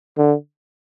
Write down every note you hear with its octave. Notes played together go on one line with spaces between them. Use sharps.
D3